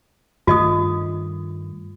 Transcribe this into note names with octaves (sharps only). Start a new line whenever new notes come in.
G2 D#3 A3 F4 D#5 D#6